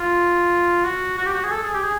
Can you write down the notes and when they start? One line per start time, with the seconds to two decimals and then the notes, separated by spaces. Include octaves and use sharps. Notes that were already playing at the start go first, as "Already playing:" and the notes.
Already playing: F4
0.84 F#4
1.17 F#4
1.26 G4
1.34 F#4
1.43 G#4
1.50 A4
1.62 G#4
1.73 G4
1.83 G#4